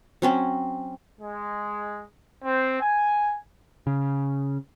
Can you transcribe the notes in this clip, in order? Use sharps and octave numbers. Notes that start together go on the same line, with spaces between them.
F#3 C4 C#4
G#3
C4
G#5
C#3